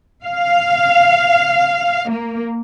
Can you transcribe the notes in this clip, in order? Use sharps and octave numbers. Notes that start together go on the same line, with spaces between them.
F5
A#3